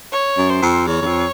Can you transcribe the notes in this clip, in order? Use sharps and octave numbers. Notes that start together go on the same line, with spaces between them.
C#5
F#2
C5
F2
E2 C#5
E2
F2